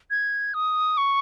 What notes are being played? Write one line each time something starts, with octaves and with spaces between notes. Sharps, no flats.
G#6
D#6
C#6